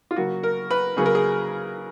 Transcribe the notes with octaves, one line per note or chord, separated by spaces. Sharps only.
F4
C#3 F#3 A#3 F#4
A#4
B4
C#3 F#3 A#3 G#4
A#4
G#4